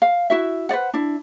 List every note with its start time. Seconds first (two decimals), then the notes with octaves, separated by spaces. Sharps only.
0.02 F5
0.30 E4 F#4 E5
0.69 B4 C5 D5 F#5
0.94 D4 E4